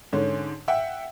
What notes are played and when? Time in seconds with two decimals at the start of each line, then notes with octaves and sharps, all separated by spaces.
0.13 G#2 D3 C#4
0.68 E5 F#5 G5